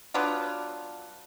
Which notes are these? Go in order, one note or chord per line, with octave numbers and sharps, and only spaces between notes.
F#3 B3 D4 F4